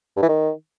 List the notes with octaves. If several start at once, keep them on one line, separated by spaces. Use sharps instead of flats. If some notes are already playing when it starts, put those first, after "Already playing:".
G2
E3
D#3